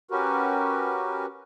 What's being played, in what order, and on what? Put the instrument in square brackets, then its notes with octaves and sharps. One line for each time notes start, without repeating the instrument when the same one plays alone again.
[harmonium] C#4 F#4 G4 A#4 B4